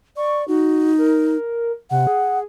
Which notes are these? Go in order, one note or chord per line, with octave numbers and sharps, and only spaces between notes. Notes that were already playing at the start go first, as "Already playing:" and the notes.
D5 C#6
D#4 F#4
A#4
C3 F#5
G#4